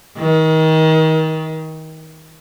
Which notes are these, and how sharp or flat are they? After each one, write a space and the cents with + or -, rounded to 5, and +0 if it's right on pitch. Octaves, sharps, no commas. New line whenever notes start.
D#3 +30